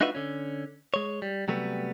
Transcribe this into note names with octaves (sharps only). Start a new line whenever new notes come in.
D4 D#4 F4 F#4 B4 E5
D3 C#4
G#3 C#5
G3
C3 F#3 G3 A3 B3